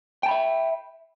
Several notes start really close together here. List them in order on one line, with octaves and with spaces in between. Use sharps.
G5 A5 B5 E5